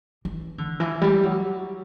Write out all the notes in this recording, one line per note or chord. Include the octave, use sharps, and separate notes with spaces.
E3
D3
E3
G3
F#3